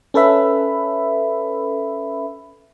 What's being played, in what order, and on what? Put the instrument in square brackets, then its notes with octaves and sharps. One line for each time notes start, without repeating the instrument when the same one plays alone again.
[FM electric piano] C#4 A4 B4 E5 B5